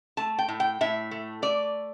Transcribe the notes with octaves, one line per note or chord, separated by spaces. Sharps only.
A3 A5
G5
A2
G5
A2 E5
A3
A3 D5